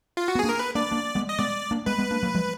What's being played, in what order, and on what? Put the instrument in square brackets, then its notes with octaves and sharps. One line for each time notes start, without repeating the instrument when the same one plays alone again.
[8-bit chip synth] F4
F#4
[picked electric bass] B3
[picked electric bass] A#3 D4 [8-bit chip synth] G#4
[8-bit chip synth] A#4
B4
[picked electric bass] A#3 D4 [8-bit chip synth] D5
[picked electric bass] A#3 D4
G#3 B3
[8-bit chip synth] D#5
[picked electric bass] G#3 B3 [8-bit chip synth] D5
[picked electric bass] A#3 D4
[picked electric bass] G#3 B3 [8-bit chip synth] B4
[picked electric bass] G#3 B3
A#3 D4
F#3 A#3
F3 G#3